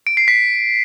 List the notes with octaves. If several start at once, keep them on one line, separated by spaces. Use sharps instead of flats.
D7
C7
B6